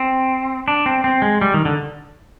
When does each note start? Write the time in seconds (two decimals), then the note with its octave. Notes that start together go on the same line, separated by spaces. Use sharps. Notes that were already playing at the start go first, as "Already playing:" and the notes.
Already playing: C4
0.68 D4
0.86 C4
1.04 C4
1.22 G#3
1.41 G3
1.54 D#3
1.65 D3